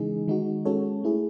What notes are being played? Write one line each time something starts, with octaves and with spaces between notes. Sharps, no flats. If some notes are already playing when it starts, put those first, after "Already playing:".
Already playing: C#3 E3 G#3 D#4 G#4
D#3 G#3 D#4 F#4
G#3 C#4 F#4 A4 C#5
A3 E4 G#4